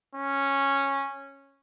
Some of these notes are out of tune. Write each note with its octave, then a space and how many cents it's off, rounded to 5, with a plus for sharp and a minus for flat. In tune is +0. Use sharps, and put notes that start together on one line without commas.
C#4 -10